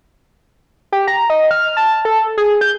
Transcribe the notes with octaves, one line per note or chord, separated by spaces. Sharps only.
G4
A#5
D#5
F6
A5
A4
G#4
G6